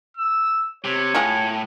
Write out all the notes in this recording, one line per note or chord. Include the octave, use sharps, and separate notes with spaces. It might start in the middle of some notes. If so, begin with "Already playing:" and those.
E6
C3 C#5
A2 F4 F#4 G#4